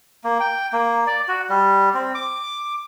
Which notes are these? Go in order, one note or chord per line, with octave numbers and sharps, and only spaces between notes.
A#3
G5
A#3
D5
F#4
G3
C4
D6